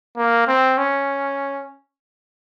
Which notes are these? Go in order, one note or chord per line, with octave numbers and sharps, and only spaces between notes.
A#3
C4
C#4